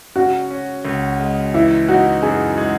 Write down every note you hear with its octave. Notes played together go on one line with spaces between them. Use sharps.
C#3 F#4
C#4
C#2
G#3
E3 E4
D#4 F#4
F#2 G#4
G#3